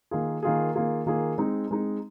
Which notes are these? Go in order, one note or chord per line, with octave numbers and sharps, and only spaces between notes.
D#3 A#3 F4 G#4
D#3 A#3 F4 G#4
D#3 A#3 F4 G#4
D#3 A#3 F4 G#4
G#3 C4 D#4
G#3 C4 D#4